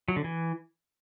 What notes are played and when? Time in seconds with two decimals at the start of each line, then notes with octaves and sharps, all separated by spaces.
0.08 F#3
0.16 D3
0.24 E3